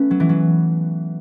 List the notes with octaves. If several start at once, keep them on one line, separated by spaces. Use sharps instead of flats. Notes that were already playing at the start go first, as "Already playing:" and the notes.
Already playing: A3 B3 C#4
F#3
E3
F#3